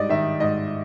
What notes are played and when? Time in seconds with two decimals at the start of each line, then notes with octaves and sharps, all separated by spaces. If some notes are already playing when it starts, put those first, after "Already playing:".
Already playing: G#2 G3 D5 D#5
0.09 D#3 E5
0.40 G#2 D#5